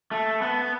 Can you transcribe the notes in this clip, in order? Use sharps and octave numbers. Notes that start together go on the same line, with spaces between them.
A3
B3